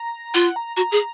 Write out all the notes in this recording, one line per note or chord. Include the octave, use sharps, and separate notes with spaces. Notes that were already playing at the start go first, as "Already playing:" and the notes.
Already playing: A#5
F4 F#5
A#5
F#4 A#5
G#4